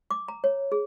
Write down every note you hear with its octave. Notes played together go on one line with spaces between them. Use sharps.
D6
A#5
C#5
G#4